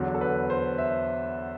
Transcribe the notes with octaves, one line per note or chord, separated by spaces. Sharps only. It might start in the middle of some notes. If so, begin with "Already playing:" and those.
Already playing: E2 D3 F#3
A4
B4
C5
E5